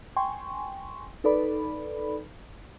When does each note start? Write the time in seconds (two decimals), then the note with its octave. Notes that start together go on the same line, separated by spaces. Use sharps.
0.17 G5 G#5 C6 C#6
1.24 D#4 A4 B4 D5 B5